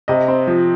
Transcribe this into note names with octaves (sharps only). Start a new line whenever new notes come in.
C3 D#5
C4
F3